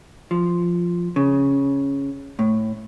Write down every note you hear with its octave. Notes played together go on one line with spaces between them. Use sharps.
F3
C#3
A2